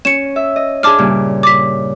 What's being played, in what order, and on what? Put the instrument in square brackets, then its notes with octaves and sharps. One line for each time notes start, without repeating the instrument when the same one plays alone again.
[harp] C#4 [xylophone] C#7 E7
[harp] E5
D#5
[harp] D4 G#4 [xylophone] A5 D6 F6
[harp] G2 A#2 C#3
[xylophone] D6 B6